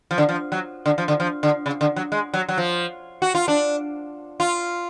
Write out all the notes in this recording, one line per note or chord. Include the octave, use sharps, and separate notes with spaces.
F3
D3
F3
F#3
D3
F3
D3
F3
D3
C#3
D3
F#3
G#3
F#3
F#3
F3
F#4
F4
D4
F4